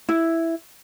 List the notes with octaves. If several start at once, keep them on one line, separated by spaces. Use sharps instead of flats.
E4